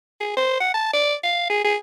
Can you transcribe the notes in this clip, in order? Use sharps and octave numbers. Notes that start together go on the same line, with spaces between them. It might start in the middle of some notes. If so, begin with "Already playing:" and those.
G#4
C5
F#5
A5
D5
F5
G#4
G#4